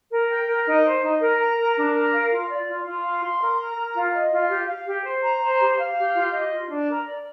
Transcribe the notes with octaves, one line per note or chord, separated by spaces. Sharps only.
A#4
G5
A#4
D#4
C5
D#4
A#4
A#5
A#4
D4
A#4
F5
F4
D5
F4
F4
F5
C6
A#4
A#5
A#4
F4
D#5
F4
G4
F5
G4
C5
A#5
C5
G4
F5
G4
F4
D#5
F4
D4
A#4
D5